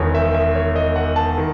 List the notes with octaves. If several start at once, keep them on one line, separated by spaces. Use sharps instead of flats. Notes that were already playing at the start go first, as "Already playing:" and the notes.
Already playing: E1 E2 D#3 C#5
E5
E5
C#5
D#5
F#5
A5
D#3